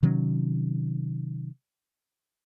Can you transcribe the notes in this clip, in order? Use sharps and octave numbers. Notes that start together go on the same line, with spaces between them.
C3 D#3 F#3 C#4